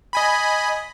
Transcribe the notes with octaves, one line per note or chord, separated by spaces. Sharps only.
D#5 G#5 B5